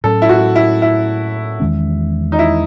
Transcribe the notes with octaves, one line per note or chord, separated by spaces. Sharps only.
A2 F#3 C#4 A4
E4
F#4
E4
E4
E2 D#3 G#3 C#4
D#4
E4